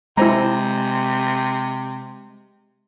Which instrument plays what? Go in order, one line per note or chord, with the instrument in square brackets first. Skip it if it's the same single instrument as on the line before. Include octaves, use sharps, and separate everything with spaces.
[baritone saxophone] C3 [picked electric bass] G#3 [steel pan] E4 C5 A#5